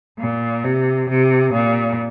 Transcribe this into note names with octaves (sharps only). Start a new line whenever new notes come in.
A#2
C3
C3
A#2